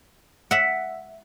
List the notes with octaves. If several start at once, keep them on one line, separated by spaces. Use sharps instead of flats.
E5 F#5